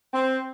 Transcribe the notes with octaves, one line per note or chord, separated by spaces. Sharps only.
C4